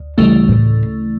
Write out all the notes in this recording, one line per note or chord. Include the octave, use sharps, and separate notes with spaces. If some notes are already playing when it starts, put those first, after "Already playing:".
Already playing: D2
D2 C#3 E3 G3 A3
A2